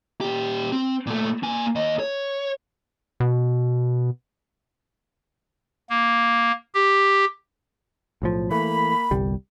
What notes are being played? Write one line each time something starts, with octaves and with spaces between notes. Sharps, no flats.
A#2 G4
C4
A#2 A3
A#3 G#5
D#2 D#5
C#5
B2
A#3
G4
B1 A2 F3
E3 A3 A#3 B5
G1 C2 G3